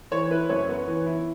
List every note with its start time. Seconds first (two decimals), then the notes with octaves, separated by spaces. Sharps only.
0.11 E3 C#5
0.30 E4 B4
0.49 F#2 C#5
0.69 B3
0.88 E3
1.06 E4